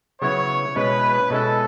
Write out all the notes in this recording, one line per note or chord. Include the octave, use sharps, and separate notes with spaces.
C#3 F#3 B3 E4 C#5
B2 G#3 C#4 E4 B4
B2 G#3 C#4 E4 A4